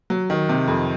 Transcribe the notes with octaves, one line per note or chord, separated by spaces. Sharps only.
F#3
D#3
C3
F2